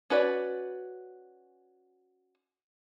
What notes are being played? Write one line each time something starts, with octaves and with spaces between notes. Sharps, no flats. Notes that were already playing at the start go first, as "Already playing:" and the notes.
C#4 F#4 B4 D5